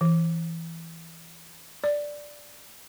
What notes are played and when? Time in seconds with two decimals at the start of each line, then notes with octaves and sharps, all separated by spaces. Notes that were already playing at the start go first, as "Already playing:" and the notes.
0.01 E3
1.84 D5